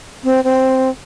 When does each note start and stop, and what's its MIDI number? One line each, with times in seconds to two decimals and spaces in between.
0.24 0.43 60
0.44 0.89 60